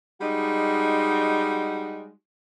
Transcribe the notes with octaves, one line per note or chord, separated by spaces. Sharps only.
G3 G#3 D#4 F#4